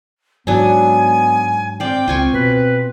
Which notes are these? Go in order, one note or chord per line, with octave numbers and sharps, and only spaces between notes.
G#2 F#3 B3 D4 G#5
C4 D5 F5 G5
C#2 C4 F4 G#5 C#6
B2 B4